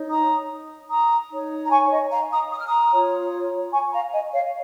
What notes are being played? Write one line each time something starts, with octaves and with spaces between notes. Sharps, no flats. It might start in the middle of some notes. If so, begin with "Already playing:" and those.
Already playing: D#4 C#5
A#5 D#6
A#5 D#6
D#4 C#5
A#5
G#5 C#6
D#5
F5 A#5
A#5 D#6
D#6
F6
A#5 D#6
F4 C#5
G#5 C#6
F5 A#5
D#5 G#5
C#5 F5